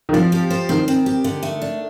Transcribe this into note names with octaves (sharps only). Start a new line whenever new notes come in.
D#3
F3 C4
G4
C5
D#3 C4
C4
G4
D3
A3
D4